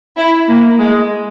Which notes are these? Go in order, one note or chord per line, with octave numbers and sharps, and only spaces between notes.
E4
A#3
G#3